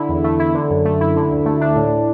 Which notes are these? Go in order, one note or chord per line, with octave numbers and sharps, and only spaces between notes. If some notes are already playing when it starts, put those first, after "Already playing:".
Already playing: D3 E4
E2
A3
E4
D3
F#2
A3
E4
D3
D2
A3
D4
A2